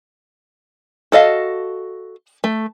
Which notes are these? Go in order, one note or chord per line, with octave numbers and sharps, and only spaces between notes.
F#4 A4 D#5 F5
A3